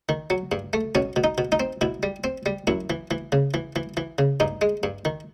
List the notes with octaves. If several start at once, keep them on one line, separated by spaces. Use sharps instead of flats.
D#3
F#3
G2
A3
B2 C#4
B2
D#4
B2
D#4
C4
B2 E4
G3
C4
G3
F#2 E4
E3
E3
C#3
E3
E3
E3
C#3
G2 D#4
G#3
G2
D#3